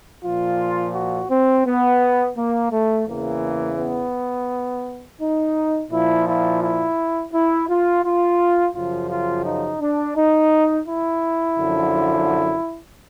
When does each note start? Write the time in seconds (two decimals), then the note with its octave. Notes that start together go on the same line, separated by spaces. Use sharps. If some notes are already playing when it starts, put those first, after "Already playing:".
0.23 A#2 F3 F4
0.95 F#4
1.30 C4
1.66 B3
2.36 A#3
2.72 A3
3.07 E2 C#3 E3 A#3
3.78 B3
5.20 D#4
5.91 A#2 F3 E4
6.26 E4
6.62 E4
7.32 E4
7.68 F4
8.04 F4
8.74 F#2 C#3 F3 F4
9.10 F4
9.45 D#4
9.80 D4
10.16 D#4
10.87 E4
11.58 F#2 D3 F3